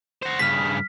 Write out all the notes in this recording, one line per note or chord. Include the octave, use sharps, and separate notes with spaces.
F#4 C5
G2 C#3 F6 B6